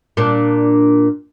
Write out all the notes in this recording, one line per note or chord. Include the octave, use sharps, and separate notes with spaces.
A#2 D4